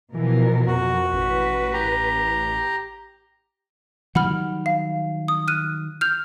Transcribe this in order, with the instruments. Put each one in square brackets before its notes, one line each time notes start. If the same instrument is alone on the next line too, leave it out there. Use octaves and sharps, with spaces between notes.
[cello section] B2 F3 A#4 [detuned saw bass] E3
[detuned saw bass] F2 [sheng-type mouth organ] F#4
[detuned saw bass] A1 [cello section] B4
[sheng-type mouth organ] G4 A#5
[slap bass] D#3 F#3 G3 [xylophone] F#5 B5 F6
[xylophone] F5
D#6
F6 F#6 D#7
F6 G6 F7